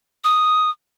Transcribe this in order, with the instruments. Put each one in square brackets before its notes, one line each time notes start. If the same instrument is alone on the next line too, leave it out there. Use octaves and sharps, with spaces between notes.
[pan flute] D#6